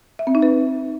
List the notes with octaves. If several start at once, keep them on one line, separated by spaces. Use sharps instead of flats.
E5
C4
D#4
B4